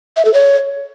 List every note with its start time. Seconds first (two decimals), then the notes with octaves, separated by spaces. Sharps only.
0.17 E5
0.25 A4
0.34 C#5